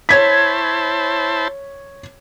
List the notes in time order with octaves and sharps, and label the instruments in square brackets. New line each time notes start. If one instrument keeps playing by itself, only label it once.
[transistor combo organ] E4 C5 A5 [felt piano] C#5 G#6 B6